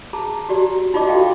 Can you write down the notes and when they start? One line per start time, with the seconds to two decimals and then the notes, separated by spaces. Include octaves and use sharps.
0.13 G#4 A5 A#5
0.49 F#4 G4 D5 A#5
0.94 D#4 F4 G4 D5 D#5 D6
1.07 F#4 G4 A4 E5 F5 G5